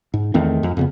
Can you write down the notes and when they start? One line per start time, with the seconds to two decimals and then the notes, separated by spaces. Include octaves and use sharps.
0.14 G#2
0.34 E2 D#3 A3 C4
0.63 F2
0.77 F2 C#3 B3